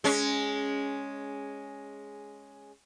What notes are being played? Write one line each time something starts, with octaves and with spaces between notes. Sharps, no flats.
G#3 C#4